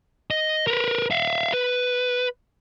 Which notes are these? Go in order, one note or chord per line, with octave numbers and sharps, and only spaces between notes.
D#5
A#4 B4
E5 F5
B4